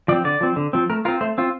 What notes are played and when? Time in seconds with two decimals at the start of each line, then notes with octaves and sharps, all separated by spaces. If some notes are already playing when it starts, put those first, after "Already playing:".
0.08 F3 D5
0.12 C4
0.24 D3 D5
0.41 F3 C4
0.56 D3
0.73 F3 C4
0.90 A3 A#4
1.05 F4 A#4
1.08 C4
1.21 A3 C5
1.38 C4 F4